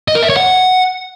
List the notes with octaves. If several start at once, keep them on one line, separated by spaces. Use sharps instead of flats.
D#5
A#4
E5
C#5
F#5